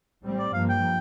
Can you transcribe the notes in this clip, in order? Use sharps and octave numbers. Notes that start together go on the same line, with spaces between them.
A2 G3 C4
D5
G2 F3 A#3 F5
G5